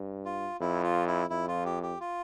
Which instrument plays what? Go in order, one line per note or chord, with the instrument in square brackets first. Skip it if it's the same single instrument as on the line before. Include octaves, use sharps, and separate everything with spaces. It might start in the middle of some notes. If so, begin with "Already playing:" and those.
Already playing: [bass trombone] G2
[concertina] F4
[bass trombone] F2 [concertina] E4
[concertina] F4
E4
[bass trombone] F2 [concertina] E4
[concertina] F4
G4
G4
F4